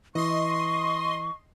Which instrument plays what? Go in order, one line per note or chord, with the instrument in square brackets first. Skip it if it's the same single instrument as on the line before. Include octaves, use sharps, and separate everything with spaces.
[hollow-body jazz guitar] E3 [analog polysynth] D#5 C6 [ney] C#6